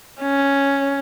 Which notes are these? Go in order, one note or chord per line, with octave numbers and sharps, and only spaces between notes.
C#4